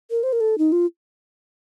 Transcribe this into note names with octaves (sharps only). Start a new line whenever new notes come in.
A#4
C5
A#4
A4
D#4
F4